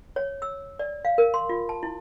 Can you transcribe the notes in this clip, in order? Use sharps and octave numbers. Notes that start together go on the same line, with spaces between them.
C#5
E6
D5
F5
A#4
C6
F4
A5
E4